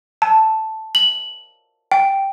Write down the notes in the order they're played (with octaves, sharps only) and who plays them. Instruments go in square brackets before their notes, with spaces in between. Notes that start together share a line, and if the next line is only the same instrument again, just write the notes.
[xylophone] A5
F#7
G5